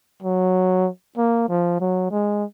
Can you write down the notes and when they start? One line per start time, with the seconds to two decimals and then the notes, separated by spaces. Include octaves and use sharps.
0.23 F#3
1.17 A#3
1.49 F3
1.80 F#3
2.11 G#3